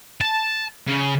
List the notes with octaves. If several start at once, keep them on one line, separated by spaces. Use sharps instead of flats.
A5
C#3